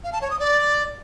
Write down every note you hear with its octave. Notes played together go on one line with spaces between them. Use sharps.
F5
A5
C#5
D#6
D5